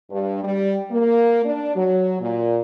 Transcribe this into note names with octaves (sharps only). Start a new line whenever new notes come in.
G2
G3
A#3
D4
F#3
A#2